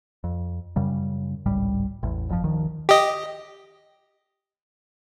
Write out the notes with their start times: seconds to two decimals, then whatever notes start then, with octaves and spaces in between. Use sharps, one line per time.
0.24 F2
0.76 F#2 C#3 G3
1.46 G#1 C#2 A2 G3
2.03 A1 E2
2.29 G1 F2 C3 F3
2.44 F#1 D2 D#3 F3
2.89 G4 D#5